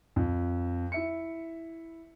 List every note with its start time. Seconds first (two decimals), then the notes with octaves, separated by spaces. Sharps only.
0.16 F2
0.92 E4 E5 C#7